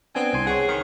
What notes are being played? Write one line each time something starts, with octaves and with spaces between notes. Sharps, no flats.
B3 C4 D4 G#5
C2 G#5 C6
G#4 C#5 F#5
D#3